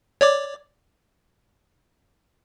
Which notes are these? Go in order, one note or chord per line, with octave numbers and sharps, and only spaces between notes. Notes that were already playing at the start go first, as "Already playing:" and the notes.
C#5 D5 D6